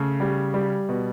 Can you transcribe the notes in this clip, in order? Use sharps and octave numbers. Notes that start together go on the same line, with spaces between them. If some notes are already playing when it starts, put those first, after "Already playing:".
Already playing: C#3 A3
G3
G3
B2